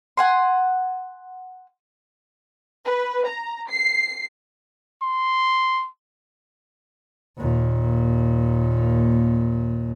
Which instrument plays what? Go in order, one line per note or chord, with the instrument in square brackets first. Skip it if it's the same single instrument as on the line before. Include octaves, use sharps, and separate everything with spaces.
[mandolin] F#5 G#5 C6
[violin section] B4
A#5
C7
[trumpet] C6
[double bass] D#2 A#2